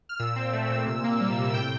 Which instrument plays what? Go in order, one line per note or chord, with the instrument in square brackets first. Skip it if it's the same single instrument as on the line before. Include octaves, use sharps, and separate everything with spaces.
[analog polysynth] F6
A#2 E6
C4
A3
A#2
C3
A#3
G3
C3
A2 G5